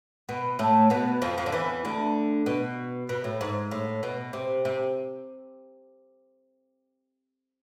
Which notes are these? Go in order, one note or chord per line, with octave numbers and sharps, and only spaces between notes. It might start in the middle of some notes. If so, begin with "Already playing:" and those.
B2 B3
A2 A3
B2 B3
F2 F3
F2 F3
D3
E2 E3
D2 D3
B2
B2
A2
G#2
A2
B2
C3
C3